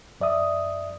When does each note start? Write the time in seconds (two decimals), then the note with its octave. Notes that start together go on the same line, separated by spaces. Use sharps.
0.20 F#2 D5 E5 D#6